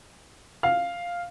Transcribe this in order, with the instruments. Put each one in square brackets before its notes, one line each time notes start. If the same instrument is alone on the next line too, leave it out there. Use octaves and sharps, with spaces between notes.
[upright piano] F5